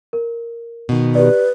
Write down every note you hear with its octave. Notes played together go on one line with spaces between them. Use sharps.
A#4
B2 D#3
G4 B4 D5